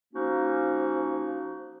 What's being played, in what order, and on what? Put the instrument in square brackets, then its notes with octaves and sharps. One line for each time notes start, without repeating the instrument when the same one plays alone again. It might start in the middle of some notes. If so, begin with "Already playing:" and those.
[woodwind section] F3 A#3 C#4 D#4 F#4